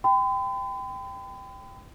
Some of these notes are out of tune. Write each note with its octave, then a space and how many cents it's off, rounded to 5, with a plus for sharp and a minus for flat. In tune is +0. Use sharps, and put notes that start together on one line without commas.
G5 +0 B5 +45